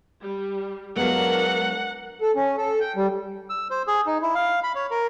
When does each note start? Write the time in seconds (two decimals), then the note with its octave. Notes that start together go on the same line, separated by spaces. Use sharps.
0.21 G3
0.97 F#3 G#3 A#3 B3 D4 A#4 F#5
2.21 A4
2.35 C#4
2.58 A4
2.80 G5
2.96 G3
3.50 E6
3.70 C5
3.87 G#4
4.06 D#4
4.22 E4
4.35 F5
4.63 B5
4.75 C#5
4.91 A#4